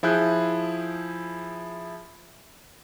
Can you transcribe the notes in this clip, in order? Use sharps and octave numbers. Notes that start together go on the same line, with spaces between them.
F3 E4 G#4 F#6 G6